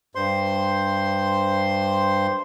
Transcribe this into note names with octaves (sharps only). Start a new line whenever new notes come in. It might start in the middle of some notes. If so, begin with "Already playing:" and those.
G2 C5 C6